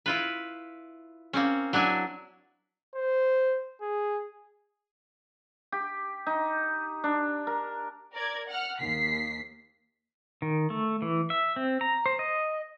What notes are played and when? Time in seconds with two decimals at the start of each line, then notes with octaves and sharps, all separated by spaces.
0.06 E4 F4 B4
1.33 A#3 C4 C#4
1.73 F#3 D4 E4 G#5
2.95 C5
3.81 G#4
5.72 G4
6.27 D#4
7.04 D4
7.47 A#4
8.13 A#4 D5 G#6
8.47 F#5 F6
8.80 D#2 B6 C7
10.42 D#3
10.70 A3
11.02 E3
11.30 E5
11.56 C4
11.81 A#5
12.06 C5
12.19 D#5